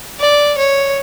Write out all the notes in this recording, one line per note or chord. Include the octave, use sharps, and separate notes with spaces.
D5
C#5